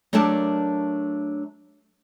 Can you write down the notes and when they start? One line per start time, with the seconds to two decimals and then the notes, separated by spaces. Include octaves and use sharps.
0.13 F#3 A3 D4 G4 A#4 A5